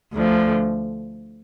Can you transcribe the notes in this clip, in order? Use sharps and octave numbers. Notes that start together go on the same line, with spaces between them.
D2 D3 F3